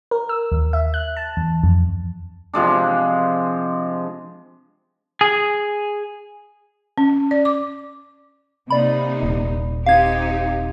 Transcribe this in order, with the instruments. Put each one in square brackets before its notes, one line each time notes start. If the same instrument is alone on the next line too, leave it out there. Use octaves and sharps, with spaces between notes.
[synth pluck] A#4
E6
D#2
E5
F#6
A5
E2
F2
[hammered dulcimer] C3 F3 G#3 D4
[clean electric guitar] G#4
[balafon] C#4
D5
D6
[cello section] C3 A#3 D#4 [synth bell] D5 B5
[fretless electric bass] D#1
[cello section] C4 D#4 G4 [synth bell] F5 G#6